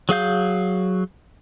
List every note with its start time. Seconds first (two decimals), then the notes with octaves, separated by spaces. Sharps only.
0.09 F#3 G#4 F5 G6